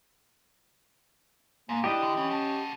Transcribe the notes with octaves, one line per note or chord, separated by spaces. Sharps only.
G#2 A#3
D4 E4 G4 D#5
D3
E3 C#4
F#4 A4